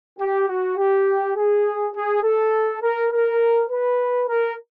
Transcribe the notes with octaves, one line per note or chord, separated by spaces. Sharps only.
G4
F#4
G4
G#4
G#4
A4
A#4
A#4
B4
A#4